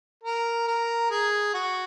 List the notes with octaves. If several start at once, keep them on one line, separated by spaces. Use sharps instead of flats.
A#4
A#4
G#4
F#4